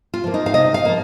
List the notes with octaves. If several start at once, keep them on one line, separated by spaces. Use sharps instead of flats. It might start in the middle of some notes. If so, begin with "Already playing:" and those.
F4
F3 A#3
D#4
F5
C3 D#5
F5
F3 A#3